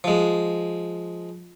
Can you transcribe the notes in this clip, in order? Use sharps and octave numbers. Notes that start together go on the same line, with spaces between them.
F3 G#3